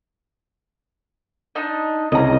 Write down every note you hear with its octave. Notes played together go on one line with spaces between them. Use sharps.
D4 D#4 D#5
C2 C#3 D#5 A#5